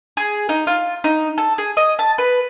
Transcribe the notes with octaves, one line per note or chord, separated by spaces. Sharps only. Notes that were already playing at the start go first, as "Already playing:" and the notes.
G#4
D#4
F4
D#4
A4
G#4
D#5
A5
B4